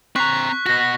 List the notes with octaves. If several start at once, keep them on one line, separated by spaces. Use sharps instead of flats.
C4 A#5 C#6 F#6 B6
B2 F#4 A#6